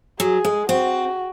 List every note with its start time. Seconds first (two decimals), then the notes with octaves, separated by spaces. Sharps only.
0.19 F#3 G#4
0.45 G#3
0.69 C4 F#4